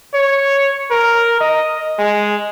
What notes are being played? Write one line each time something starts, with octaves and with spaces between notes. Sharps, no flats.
C#5
A#4
D#5
G#3